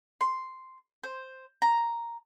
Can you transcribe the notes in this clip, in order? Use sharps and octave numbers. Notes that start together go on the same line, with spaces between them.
C6
C5
A#5